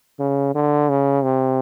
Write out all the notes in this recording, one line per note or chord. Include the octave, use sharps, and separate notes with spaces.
C#3
D3
C#3
C3